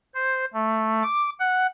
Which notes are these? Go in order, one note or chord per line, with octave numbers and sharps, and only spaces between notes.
C5
A3
D6
F#5